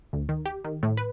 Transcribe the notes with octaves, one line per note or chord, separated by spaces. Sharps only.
D2
D#3
G4
D#3
A2
B4